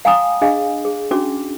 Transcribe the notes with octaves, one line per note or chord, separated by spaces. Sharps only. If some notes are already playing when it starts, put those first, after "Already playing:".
F5 G5 G#5 A#5 D6 D#6
D4 G#4 D#5 F5 G#5
G#4
C#4 D4 F#4 D6